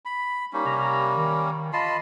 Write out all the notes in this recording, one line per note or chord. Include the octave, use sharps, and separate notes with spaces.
B5
G3 A#3 C#4 D#4
C3 G4 A#5
D#3
F4 D#5 A5 B5 C6